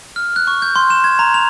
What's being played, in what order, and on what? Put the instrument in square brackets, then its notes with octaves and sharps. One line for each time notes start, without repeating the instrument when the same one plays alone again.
[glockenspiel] F6
F#6
C#6
G6
C6
E7
G#6
A#5
F7